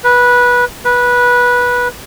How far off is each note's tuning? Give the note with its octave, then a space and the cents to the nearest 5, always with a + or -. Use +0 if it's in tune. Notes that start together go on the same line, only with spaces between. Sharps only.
B4 -15
B4 -15